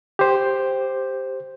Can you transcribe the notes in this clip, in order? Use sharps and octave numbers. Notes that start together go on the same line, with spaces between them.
G4 C5